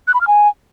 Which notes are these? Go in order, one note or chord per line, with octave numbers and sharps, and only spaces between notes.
F#6
B5
F6
G#5